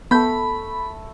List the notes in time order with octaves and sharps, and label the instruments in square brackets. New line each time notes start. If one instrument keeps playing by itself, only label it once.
[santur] A3 A4 [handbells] B3 G6 [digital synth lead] B5